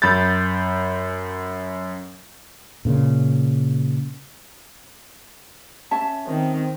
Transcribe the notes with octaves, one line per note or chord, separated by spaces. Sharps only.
F#2 B5 G6 A6
A#2 C#3
C#4 E5 A5
D#3 C4